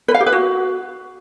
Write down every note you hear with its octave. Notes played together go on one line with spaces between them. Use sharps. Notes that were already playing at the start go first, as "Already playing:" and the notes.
B4
F5
G4
B4
F#4